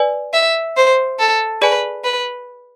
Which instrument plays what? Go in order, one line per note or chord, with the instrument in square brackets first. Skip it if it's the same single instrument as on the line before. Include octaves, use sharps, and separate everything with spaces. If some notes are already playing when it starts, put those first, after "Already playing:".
Already playing: [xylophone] B4 D5 G#5
[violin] E5
C5
A4
[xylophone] G#4 D5 G#5 [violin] B4
[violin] B4